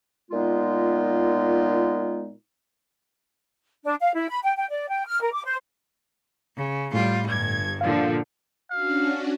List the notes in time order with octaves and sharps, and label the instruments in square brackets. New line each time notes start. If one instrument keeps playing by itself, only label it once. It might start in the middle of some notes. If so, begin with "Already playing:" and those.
[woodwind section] A#2 G#3 B3 D#4 F4
[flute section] D4
F5
E4
B5
G5
G5
D5
G5
F6
A#4
D6
C5
[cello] C#3
[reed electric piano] A2 [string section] G3 [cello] F4
[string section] G1 G#6 [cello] G2
[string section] A#2 D3 F3 [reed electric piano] F5
[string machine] C#4 D4 F#4 [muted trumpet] F5